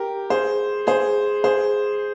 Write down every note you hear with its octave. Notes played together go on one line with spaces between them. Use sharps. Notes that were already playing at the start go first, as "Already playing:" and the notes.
Already playing: G4 A#4
G#4 C5
G#4 C5
G#4 C5